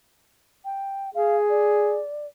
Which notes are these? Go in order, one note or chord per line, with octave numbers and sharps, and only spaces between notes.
G5
G#4 F5
D5